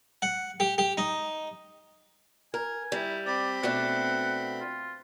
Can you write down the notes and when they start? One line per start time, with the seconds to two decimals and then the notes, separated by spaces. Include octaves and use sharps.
0.22 F#5
0.60 G4
0.78 G4
0.97 D#4
2.54 A#4 G#5
2.92 G3 E4
3.26 C4 D5 B5
3.63 B2 A3 D4 F#5
4.61 F4